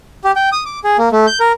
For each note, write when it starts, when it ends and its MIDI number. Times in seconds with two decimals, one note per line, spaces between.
0.24 0.32 67
0.36 0.49 79
0.52 0.64 87
0.65 0.79 86
0.84 0.97 68
0.98 1.09 58
1.12 1.26 57
1.27 1.39 91
1.40 1.52 70